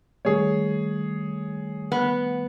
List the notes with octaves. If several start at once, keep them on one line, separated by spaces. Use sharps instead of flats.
D#3 G3 A3 G#4 C#5
B3